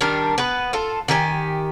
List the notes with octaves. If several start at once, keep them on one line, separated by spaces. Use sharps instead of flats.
D#3 G3 D4 A#4
B3 B4
F4 A4
D#3 G4 A4 G#5